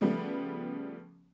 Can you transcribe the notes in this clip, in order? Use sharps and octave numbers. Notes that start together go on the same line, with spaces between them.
C#3 F3 G3 A3 B3